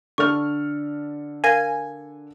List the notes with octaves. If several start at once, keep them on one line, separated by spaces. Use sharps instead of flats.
D3 A4 C#6 F6
A#4 F5 G#5 A#6